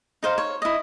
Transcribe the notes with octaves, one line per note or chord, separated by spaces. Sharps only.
D#4 C5 F5
C#5
E4 D#5